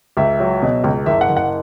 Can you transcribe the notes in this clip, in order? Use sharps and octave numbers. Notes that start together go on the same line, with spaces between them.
C#2 E5
F#3
B2
C#2
F#1 E5
F#5
F#1
F#5